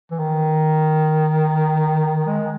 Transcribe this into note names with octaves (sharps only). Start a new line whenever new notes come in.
E3
D#3
G#3